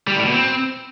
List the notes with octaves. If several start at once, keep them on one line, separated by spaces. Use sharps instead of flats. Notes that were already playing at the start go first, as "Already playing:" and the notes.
G3
A2
B2
C4